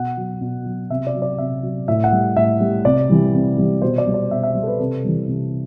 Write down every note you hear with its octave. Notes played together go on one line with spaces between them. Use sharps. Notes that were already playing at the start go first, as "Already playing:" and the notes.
Already playing: B2 F#5
F#3
B2
F#3
C3 E5
D5
F#3
D5
C3 E5
F#3
A2 E5
F#5
G3
A2 E5
G3
C3 D5
E3 G3
C3
E3 G3
B2 C5
D5
G3
D5
B2 E5
E5
G3
A4
B4
C3 A4
E3 G3
C3